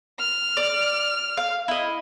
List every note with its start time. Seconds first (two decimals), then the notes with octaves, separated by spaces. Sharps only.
0.20 F6
0.57 D5
1.37 F5
1.68 E4 D#5